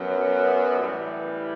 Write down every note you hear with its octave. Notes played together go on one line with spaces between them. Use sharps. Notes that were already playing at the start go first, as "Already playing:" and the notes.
Already playing: F#2 F#3 B3
A2 E3 G3